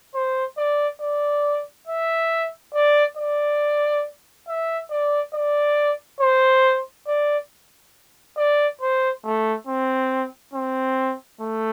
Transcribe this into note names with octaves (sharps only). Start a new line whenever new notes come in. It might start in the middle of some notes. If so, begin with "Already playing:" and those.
C5
D5
D5
E5
D5
D5
E5
D5
D5
C5
D5
D5
C5
A3
C4
C4
A3